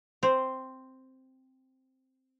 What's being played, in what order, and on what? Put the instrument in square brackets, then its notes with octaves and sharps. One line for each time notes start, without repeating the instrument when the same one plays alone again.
[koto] C4 C5